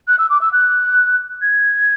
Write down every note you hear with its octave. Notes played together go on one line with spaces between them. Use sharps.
F#6
E6
D6
E6
F#6
G#6